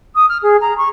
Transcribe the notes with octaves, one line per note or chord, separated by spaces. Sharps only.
D#6
F6
G#4
A#5
C#6